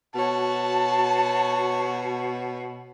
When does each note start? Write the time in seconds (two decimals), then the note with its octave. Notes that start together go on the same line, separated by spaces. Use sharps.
0.15 B2 F#4 C#5 A5